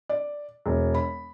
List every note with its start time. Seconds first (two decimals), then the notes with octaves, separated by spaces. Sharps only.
0.09 D5
0.66 E1
0.94 B5